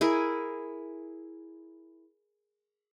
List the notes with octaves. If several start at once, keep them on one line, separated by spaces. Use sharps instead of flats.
E4 G#4 A#4 G#5